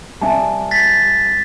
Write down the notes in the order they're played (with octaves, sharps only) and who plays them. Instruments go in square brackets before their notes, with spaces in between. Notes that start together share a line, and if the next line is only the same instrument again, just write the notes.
[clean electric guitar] G3 C4 D5 [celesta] E5 G#5 A5
[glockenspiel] A6 B6